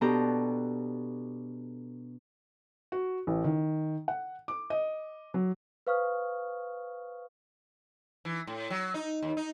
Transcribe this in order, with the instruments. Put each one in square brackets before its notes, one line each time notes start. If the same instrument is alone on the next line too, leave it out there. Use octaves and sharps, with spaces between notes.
[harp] B2 B3 D4 G4 A4 A#5
[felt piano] F#4
A1
D#3
F#5
D6
D#5
F#3
[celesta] B4 C5 F5 C#6 D#6 F6
[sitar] E3
A2
F#3
D#4
D#2
D#4